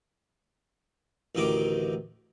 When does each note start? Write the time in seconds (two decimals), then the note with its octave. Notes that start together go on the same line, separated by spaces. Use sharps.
1.35 A1 D2 D#3 D#4 D6